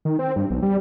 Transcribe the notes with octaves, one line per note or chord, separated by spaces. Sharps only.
D#3
C4
G2
B1
G3